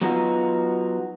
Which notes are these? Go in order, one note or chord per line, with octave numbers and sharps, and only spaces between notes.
F#3 B3 D#4 F4 F#4